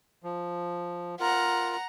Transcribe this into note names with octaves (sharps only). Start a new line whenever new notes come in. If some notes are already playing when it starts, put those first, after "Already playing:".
F3
F4 A#4 F#5 A#5